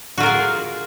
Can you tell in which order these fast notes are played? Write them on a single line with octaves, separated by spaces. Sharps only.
F#4 F4 A#4 G#4